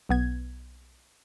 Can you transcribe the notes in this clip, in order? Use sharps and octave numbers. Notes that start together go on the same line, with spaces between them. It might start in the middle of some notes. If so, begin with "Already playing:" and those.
B1 B3 G#6